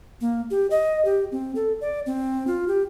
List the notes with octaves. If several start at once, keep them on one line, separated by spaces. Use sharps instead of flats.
A#3
G4
D#5
G4
C4
A4
D5
C4
F4
G4